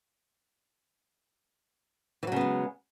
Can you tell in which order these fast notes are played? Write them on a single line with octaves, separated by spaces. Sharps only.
E3 F#3 C#3 B3 G#3